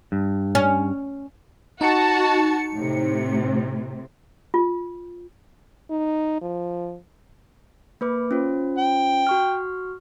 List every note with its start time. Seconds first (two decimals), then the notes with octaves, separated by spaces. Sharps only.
0.12 G2
0.55 C#4
1.81 D#4 F#4 A5 C#7
2.74 A2 C3
4.54 F4
5.90 D#4
6.41 F3
8.01 A#3 B4 D6
8.31 C#4 F4 C5
8.78 G5
9.27 F#4 C#6 F6